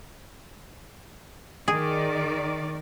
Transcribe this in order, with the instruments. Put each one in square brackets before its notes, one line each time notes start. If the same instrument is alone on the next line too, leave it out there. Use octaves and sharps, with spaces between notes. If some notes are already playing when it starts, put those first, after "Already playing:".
[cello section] D#3 D5 [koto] G#4